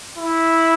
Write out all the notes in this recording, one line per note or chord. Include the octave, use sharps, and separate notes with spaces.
E4